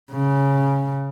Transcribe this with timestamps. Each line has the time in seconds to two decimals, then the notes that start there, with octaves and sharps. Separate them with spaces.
0.12 C#3